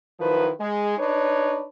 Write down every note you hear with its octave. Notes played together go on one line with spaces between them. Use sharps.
D#3 F3 F#3 E4 B4
G#3
D4 D#4 B4 C#5